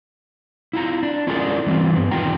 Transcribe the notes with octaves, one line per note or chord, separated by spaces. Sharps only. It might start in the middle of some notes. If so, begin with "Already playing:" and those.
E4 F4 A#5
D4
C#4 E4 F4 G#4 A#4 D5
E3 G3 C4 F4
G2 B3
E2 D#3 F4 G5 A#5